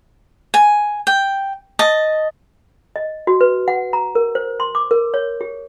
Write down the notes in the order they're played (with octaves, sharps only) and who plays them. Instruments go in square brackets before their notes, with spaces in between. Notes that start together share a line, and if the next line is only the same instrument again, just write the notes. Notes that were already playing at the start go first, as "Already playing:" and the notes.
[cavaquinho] G#5
G5
D#5 A5
[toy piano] D#5
F#4
B4
F#5
A#5
A#4
C5
C6
D6
A#4
C#5
G4